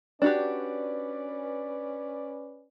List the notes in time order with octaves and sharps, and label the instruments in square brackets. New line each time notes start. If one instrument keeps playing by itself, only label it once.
[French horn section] C#4 B4 D5 [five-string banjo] D4 F#4 G4